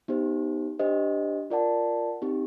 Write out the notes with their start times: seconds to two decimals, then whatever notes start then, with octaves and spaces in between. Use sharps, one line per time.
0.08 B3 D#4 G4 C5
0.79 D4 G4 C5 D#5
1.50 F4 A#4 D5 F#5 A5
2.22 C4 D#4 G4